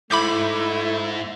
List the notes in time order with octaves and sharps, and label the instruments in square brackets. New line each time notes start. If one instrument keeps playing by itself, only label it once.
[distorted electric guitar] G#2 [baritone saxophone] A3 [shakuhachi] E4 [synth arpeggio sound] B5 D6 G6